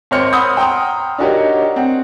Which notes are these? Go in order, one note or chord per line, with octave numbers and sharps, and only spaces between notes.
G#1 C4 C5 C#5 F6 C#7
F#5 B5 C6 D#6 E6 G6
G5 A#5 C6 D#6
D4 D#4 F#4 G4 A#4 C#5
C4 F#5